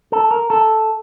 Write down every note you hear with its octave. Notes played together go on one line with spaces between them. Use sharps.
A4
A#4
A4